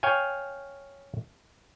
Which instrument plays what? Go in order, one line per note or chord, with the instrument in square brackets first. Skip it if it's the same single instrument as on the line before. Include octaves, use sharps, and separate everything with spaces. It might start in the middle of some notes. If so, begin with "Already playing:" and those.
[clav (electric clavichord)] C#5 F5 G5 G#5